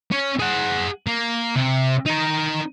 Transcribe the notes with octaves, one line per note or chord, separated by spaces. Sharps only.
C#4
G#4 F#5
A#3
C3
D#4 A#4